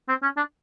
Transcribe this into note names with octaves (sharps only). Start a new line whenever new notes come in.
C4
C#4
D4